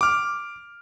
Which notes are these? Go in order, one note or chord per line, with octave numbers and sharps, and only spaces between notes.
D6 F6